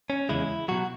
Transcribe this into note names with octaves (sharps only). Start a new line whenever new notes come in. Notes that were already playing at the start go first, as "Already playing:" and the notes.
C#4
E2 C#3 G#3 E4
B2 F#3 F#4